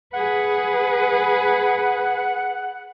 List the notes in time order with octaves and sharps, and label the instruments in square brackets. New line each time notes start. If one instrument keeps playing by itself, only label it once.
[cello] G#4 B4 [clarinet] F#5